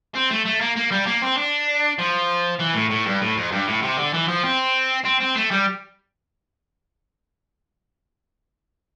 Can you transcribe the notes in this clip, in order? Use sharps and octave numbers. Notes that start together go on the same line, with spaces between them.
C4
A3
A3
A#3
A#3
G3
A#3
C4
D4
F3
E3
A2
A2
G2
A2
F2
G2
A2
C3
D3
E3
F3
C4
C4
C4
A3
G3